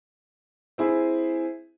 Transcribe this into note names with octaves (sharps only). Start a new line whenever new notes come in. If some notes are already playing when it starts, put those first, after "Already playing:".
C4 E4 G#4